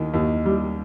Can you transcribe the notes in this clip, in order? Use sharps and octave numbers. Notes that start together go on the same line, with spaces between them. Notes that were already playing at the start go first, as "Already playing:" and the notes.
Already playing: D#2 D#3
D#2
G3